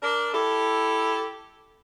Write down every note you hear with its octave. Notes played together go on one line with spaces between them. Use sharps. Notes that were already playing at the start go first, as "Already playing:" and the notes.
D4 A#4
E4 G4 A4